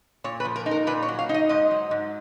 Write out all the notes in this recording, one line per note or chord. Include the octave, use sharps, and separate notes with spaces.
A#2 C#5
B4
F3
A#4
D#4
A#4
A#2 B4
C#5
F#3
F5
D#4
D#5
G#2 D#5
F#3
G#2